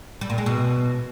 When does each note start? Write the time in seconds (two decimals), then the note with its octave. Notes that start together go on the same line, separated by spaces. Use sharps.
0.21 G3
0.30 A#2
0.38 G#3
0.46 B2